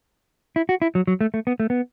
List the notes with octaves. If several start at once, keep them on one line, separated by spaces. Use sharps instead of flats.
E4
F#4
E4
F#3
F#3
A3
A3
B3
A3
B3